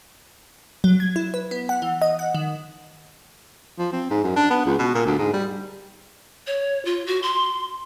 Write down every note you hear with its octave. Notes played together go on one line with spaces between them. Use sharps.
F#3
G#6
E4
B4
B3
F#5
E3
D#5
F#5
D#3
F3
C4
G#2
F#2
D4
B3
C#2
B2
A#2
D2
G#2
G3
C#5
F4
F#4
C6